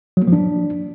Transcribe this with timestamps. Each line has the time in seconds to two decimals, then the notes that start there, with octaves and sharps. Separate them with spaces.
0.17 F#3
0.22 A#3
0.27 F3
0.33 D4